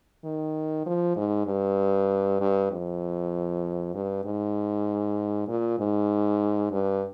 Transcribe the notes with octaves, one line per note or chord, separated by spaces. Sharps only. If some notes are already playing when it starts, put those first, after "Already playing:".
D#3
F3
G#2
G2
G2
F2
G2
G#2
A#2
G#2
G2